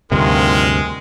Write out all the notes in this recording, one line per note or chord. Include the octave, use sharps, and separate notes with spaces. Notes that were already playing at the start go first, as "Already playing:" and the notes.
D2 G2 C3 D#3 G#3 F4 A#4